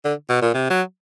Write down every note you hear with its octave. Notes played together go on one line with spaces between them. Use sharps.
D3
B2
A#2
C3
F#3